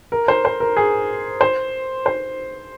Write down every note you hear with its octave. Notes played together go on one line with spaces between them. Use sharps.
A#4
C5
C5
A#4
G#4
C5
C5